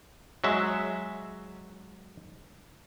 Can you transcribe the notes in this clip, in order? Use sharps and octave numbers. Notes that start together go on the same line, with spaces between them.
F#3 G#3 E5